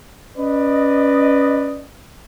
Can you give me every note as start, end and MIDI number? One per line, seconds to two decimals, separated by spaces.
0.36 1.84 61
0.36 1.84 71
0.36 1.84 74
0.36 1.84 75